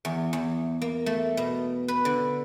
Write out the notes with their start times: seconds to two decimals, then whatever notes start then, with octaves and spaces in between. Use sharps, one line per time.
0.05 E2
0.33 E2
0.82 A#3
1.06 A3
1.37 B2
1.88 B4
2.05 D3